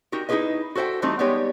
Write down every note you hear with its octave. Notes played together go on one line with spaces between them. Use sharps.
D#4 F#4 G4 A#4
D#4 E4 G4 G#4 B4 D#5
F#4 A4 C5 E5 G5
E3 G3 A3 C4 D#4
G3 G#3 B3 D#4 G4 C#5